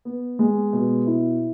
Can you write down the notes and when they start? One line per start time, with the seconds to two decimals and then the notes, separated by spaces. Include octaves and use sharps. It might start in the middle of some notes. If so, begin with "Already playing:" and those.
0.05 B3
0.39 G#3
0.73 B2
1.07 E4